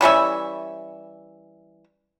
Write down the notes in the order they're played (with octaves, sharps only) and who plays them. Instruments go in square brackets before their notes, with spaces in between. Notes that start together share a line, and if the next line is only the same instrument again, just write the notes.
[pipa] E3 G3 C#4 E5